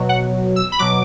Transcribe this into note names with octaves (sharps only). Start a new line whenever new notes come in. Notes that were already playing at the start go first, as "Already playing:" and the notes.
Already playing: B2 F#3
F#5
E6
B5
B2 F#3 D6